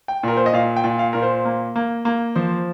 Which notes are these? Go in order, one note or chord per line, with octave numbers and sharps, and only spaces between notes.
G5
A#2 A#4
C5
D#5
A#2 F5
G5
A#2
F5
A#2 A#4
C5
A#3
A#3
A#3
F3 C5